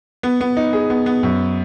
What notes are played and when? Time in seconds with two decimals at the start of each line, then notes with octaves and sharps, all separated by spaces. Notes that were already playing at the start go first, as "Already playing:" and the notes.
0.23 B3
0.41 B3
0.57 D#4
0.73 G#4
0.90 B3
1.06 B3
1.23 F#2